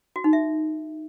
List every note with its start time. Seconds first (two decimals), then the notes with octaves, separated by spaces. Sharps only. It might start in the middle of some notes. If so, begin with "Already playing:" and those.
0.16 F#4
0.24 D#4
0.33 E5